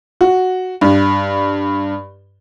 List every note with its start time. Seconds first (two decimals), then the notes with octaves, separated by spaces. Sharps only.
0.21 F#4
0.81 G2